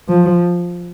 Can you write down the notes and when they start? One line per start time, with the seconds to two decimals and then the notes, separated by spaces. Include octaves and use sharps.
0.09 F3